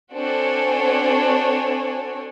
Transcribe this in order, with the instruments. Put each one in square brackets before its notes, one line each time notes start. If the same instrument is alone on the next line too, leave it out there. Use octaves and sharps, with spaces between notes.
[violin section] C4 D4 F#4 A4 C#5 G#5